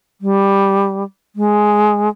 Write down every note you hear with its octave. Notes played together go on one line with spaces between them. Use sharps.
G3
G#3